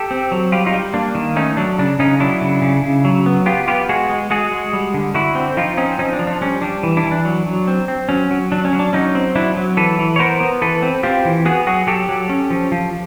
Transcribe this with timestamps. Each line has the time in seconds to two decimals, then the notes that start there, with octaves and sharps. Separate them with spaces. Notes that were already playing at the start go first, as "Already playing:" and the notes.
Already playing: G4 A4
0.11 C4
0.32 F#3
0.52 G3 F4 G4
0.66 D#4 F4
0.73 G3
0.94 A#3 D4
1.15 D#3
1.36 A3 C#4 D#4
1.57 F#3 D4
1.79 C#3 D4
1.99 C#3 C#4 D#4
2.20 F#3 D4 E4
2.41 C#3
2.62 C#3
2.83 C#3
3.05 F#3
3.26 B3
3.46 B3 F4 G4
3.68 B3 F4 G4
3.89 G#3 F#4 G#4
4.09 G#3
4.30 G#3 F#4 G#4
4.52 G#3
4.73 G3
4.94 D3
5.14 D3 E4 F#4
5.35 C4
5.57 F3 D#4 F4
5.77 C4 C#4 D#4
5.99 F3 C#4 D#4
6.13 D4
6.19 F3
6.27 D4
6.41 G3 C#4
6.62 G3 D4
6.83 E3
6.97 D4 E4
7.04 E3
7.12 D4
7.25 F#3
7.46 F#3
7.68 C4
7.88 C4
8.09 F#3 C#4
8.31 F#3
8.52 F#3 D4
8.65 C#4
8.73 F#3
8.79 D4
8.93 F#3 C#4 D#4
9.15 C4
9.35 F#3 D4 E4
9.57 F#3
9.77 E3 A4 B4
9.99 E3
10.16 C#5
10.19 B3 A#4 C5
10.40 B3
10.62 E3 A4 B4
10.82 C4
11.03 C4 F4 G4
11.25 E3
11.45 B3 F#4 G#4
11.67 F#3 F#4 G#4
11.87 F#3 G4 A4
12.09 F#3
12.29 C#4
12.50 F3
12.72 F3